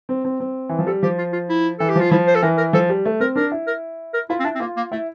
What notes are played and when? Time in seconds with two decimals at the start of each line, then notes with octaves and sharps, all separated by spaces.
0.09 C4
0.25 C4
0.40 C4
0.69 E3
0.79 F3
0.87 G3 A4
1.03 F3 G4
1.18 F4
1.33 F4
1.49 E4
1.79 E3 A4
1.89 G4
1.95 F3 F4
2.11 F3 E4
2.27 C5
2.35 A4
2.42 E3 A#4
2.58 A#4
2.73 F3 A4
2.90 G3
3.05 A3
3.20 C4 A#4
3.36 D4 A#4
3.52 E4
3.67 A#4
4.14 A#4
4.30 E4 F4
4.40 C4
4.45 D4 E4
4.55 C4
4.60 A#3 F4
4.77 A#3
4.92 A3 E4